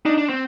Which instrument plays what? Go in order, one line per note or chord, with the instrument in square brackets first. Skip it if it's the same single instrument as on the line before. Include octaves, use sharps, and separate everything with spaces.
[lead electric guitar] D4 [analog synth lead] D#4
[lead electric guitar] D4
C4